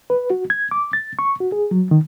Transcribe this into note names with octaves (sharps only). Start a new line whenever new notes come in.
B4
F#4
G#6
D6
A6
C#6
F#4
G#4
F#3
D#3